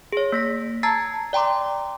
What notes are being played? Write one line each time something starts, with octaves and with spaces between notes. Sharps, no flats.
G#4 C#5
A#3 A#6 B6
A5 A#5 E6 G#6 A6 C7
D5 G5 A#5 C6 D6